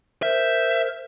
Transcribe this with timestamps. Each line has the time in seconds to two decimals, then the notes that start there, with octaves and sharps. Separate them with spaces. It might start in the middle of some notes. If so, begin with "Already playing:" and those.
0.23 A#4 C5 E5 G6